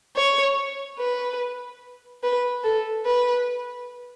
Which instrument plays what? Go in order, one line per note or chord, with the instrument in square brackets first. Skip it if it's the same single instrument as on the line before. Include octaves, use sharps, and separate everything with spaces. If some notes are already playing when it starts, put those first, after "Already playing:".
[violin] C#5
B4
B4
A4
B4